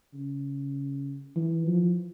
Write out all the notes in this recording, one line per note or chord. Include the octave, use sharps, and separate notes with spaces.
C#3
E3
F3